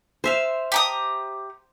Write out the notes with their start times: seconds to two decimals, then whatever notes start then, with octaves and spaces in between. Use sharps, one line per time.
0.24 C5 E5 F5
0.72 G4 A#5 D#6